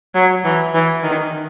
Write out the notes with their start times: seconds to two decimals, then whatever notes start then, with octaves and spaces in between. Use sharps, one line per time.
0.15 F#3
0.44 E3
0.74 E3
1.03 D#3